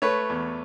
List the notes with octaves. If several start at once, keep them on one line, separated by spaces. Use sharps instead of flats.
A3 B4 C#5
E2